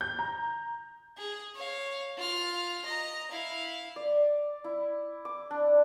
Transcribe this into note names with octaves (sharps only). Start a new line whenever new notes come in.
G6
A#5
G#4
C#5 F5
F4 F6
D#5 A#5
E4 F5
D5
E4
D6
D4